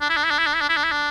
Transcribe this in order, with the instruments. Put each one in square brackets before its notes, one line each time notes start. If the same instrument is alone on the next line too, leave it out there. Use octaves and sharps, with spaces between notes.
[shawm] D4
E4
D4
E4
D4
E4
D4
E4
D4
E4
D4
E4
D4